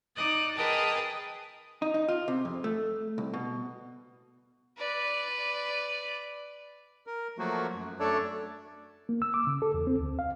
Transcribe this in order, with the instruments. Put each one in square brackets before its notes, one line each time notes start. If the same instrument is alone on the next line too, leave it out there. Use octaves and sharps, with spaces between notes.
[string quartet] D#4 D5 D#5 F#6
G#4 A#4 B4 D#5 G5 A5
[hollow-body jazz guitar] D#4
D#4
F4
C3
F2
A3
C2
B2
[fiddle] B4 D5
[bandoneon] A#4
F3 F#3 A3 A#3 F#4
F#2
F#2 A3 D4 A4 C#5 D5
[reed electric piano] A#3
E6
D6
C#3
A4
E2
C4
D2
F5